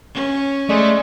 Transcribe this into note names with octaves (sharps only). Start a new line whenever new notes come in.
C#4
G#3 A3 D5